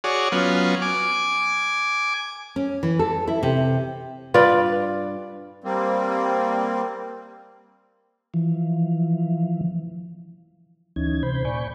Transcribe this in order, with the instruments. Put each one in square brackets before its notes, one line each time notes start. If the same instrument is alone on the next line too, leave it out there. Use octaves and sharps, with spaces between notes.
[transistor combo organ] F#4 G#4 C#5 D5
F#3 B3 C#4 F4
G#5 D6
[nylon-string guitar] C#4
E3
A4
E4
C3
[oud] G2 B4 [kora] F4 D5
[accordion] G3 A#3 C4
[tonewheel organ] E3 F3
D2 E3 C#4 D#4 G#6
C3 C5 B5 G6
A#2 D5 G#5 B5 C#6 G6